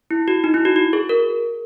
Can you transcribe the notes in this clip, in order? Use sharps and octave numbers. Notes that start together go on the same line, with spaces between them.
E4
F#4
D#4
E4
F#4
F#4
G#4
A#4